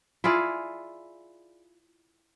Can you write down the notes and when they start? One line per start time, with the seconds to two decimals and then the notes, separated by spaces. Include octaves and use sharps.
0.24 E4 F4 G#4 D5